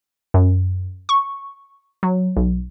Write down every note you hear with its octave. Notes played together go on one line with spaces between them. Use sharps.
F#2
C#6
F#3
B1